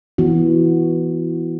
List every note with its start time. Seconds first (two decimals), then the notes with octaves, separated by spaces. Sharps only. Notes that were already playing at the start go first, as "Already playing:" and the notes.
0.18 E3 B3 F#4